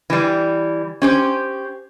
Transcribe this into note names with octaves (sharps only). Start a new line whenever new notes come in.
E3 G3
C#4 G4 C5